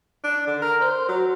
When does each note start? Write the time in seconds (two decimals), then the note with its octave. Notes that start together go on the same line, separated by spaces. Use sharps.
0.24 D4
0.47 D3
0.62 A#4
0.81 C5
1.08 F#3